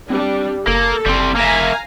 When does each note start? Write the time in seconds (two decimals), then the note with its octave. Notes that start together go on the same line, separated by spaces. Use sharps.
0.10 G3 C4 D4
0.67 F#1 A#3 A4
1.06 F#1 G3 C4
1.36 A#3 E5 F5 G#5 A#5